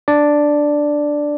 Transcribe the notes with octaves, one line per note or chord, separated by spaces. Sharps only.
D4 D5